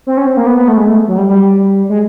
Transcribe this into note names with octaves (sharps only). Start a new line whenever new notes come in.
C4
C#4
C4
A#3
B3
B3
A3
G#3
A3
F#3
G3
G3
G#3